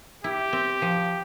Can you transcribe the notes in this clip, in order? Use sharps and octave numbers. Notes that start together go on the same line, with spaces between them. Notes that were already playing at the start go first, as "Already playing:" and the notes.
E4 G4
C4
F3